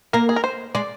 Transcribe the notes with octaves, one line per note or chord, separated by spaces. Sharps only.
A#3 A#4
G#4
A#4
C5
G#3 D5